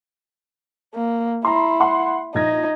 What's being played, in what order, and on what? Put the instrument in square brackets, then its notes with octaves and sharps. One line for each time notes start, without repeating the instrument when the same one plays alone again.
[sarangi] A#3
[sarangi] E4 [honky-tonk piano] A#5 C6
[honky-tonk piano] F#5 C6
[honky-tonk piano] A#1 G#6 A#6 [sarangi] D#4